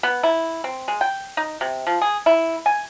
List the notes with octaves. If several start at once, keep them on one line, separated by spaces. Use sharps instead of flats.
B3
E4
C4
G#3
G5
D#4
C3
F3
G#4
E4
G#5